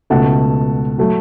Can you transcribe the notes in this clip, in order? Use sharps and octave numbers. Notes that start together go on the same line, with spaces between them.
C#2 B2 A3 F#5 A5
F#3 A3